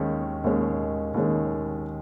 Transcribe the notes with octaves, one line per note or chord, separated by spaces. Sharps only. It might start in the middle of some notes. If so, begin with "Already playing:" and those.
Already playing: D#2 D#3 G#3 C#4
D#2 D#3 G#3 C#4
D#2 D#3 G#3 C#4